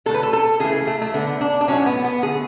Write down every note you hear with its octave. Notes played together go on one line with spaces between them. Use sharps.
D3 A3 A4
B4
A4
A4
C#3 E3 A3 G#4
A3
A3
D3 A3 B3
D4
D4
A2 F#3 A3 C#4
B3
B3
D3 A3 G#4